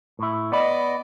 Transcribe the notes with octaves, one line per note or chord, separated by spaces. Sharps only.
A2 E4
B3 D5 D#5 B5